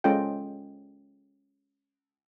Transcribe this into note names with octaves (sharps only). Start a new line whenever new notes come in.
G#3 C#4 F4 A4 D#5 G5